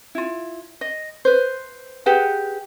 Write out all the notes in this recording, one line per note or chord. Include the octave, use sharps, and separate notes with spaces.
E4 F4
D#5
B4 C5
G4 G#4 B4 F#5